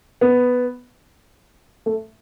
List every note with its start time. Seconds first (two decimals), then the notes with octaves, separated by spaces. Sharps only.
0.21 B3
1.86 A3